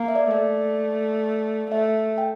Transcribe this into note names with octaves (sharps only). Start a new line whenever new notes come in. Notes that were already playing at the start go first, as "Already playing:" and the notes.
Already playing: A#3
E5
D5
A3 D5
A3 E5
G5